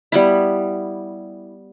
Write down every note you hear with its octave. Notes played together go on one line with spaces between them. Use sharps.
G3 B3 E4